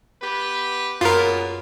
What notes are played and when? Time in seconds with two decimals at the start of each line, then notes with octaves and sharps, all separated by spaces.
0.22 B3 G4 B4
1.01 F#2 A#2 C#3 B3 F4 A#4